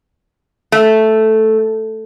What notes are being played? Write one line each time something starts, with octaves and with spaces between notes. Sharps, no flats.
A3